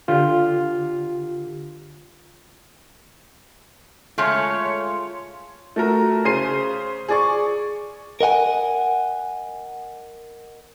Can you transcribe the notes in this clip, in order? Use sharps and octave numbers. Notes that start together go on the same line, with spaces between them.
D3 F4 G4
C#3 G#3 A3 F4 C#5
A3 F#4 A#4
C#3 G#4 C5 C7 D#7
G#4 D5 C#6
A#4 D#5 F#5 G#5